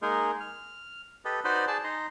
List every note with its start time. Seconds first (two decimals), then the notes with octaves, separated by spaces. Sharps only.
0.02 G#3 A#3 D#4 G#4 A#4
0.40 F6
1.25 G4 A4 B4 D#5
1.44 D#4 F#4 B4 C5 D5 D#5
1.68 G#4 D5 A5
1.84 D#4 A#5 C6